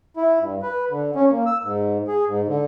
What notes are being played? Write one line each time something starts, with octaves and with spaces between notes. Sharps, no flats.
E4
G2
B4
D3
C#4
A#3
E6
G#2
G#4
G#2
D3